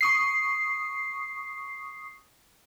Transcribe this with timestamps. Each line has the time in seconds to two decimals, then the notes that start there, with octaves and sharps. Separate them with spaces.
0.01 C#6 D#6 C7